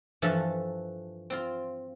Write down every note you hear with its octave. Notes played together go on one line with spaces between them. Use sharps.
G2 E3 F3 A3 E5 A5
C4 F4